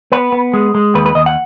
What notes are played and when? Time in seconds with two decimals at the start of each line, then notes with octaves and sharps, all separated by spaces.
0.12 B3 B4
0.32 B3
0.53 G#3
0.75 G#3
0.95 D#2 B4
1.06 B4
1.15 D#2 D#5
1.26 F#5